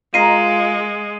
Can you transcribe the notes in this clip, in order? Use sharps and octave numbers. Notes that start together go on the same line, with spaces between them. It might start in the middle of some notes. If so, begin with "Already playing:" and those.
G#3 F4 A#4 D#5 A#5 C7 D#7